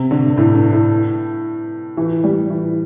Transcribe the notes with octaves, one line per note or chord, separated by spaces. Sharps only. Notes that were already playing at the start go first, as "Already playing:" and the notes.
Already playing: C3
D3
G2
A2
G2
A2
E3
G3
E3